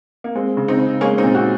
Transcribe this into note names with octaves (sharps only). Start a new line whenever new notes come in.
A#3
G#3 C4
C#3
C4 D#4
C#3
G#3 A#3 C#4
C4 D#4
A#2
D#4 F#4